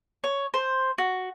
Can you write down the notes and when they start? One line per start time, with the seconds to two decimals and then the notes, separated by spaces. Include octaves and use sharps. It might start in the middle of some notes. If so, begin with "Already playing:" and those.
0.24 C#5
0.54 C5
0.98 F#4